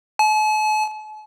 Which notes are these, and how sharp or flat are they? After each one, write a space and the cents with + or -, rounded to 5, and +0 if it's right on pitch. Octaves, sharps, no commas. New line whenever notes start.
A5 -45